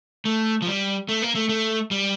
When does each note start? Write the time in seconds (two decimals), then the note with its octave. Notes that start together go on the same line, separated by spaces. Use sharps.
0.25 A3
0.62 F3
0.67 G3
1.09 A3
1.22 A#3
1.35 A3
1.49 A3
1.91 G3